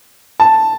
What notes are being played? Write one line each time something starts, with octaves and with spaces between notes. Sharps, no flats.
A5